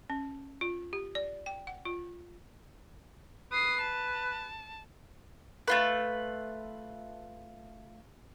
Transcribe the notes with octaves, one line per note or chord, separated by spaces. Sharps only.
C#4
F4
G4
D5
G5
F#5
F4
B4 D#6 C7
A5
A3 F4 B4